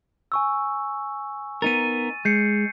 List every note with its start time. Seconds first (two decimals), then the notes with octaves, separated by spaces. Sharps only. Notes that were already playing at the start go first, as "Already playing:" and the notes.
0.32 G#5 C#6 E6
1.62 B3 D#4 A#4 A6 D#7
2.25 G#3 G6 C7 C#7